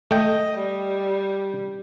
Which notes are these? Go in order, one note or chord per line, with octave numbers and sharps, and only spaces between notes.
A3 D#5 G5
G3